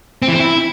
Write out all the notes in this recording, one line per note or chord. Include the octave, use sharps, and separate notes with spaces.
C4
E3
C4
E4